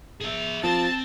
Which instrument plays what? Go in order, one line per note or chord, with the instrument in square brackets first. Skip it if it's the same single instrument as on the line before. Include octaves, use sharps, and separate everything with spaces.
[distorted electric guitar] G#4 E5
[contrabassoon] F3 [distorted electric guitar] C4 [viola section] A5